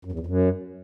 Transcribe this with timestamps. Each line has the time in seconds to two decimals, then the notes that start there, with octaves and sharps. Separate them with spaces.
0.05 F#2
0.12 E2
0.19 F2
0.26 F#2